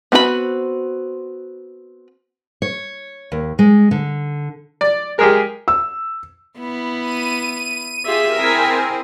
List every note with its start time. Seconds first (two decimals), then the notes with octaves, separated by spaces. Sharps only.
0.12 B3 C4 F#4 G#4 B5
2.62 C#5
3.32 D#2
3.59 G#3
3.91 D3
4.81 D5
5.19 G#3 G4 G#4 A#4
5.68 E6
6.58 B3 E4
7.01 D#7
8.06 F4 G4 G#4 E5
8.37 C4 E4 G#4 A#4 G#5